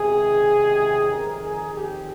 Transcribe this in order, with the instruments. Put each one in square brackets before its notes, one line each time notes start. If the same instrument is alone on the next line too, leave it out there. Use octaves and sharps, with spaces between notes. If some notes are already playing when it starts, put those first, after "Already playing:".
Already playing: [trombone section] C#2 C3 D#3 G#4
F2 D#3 A#4
G#4
G4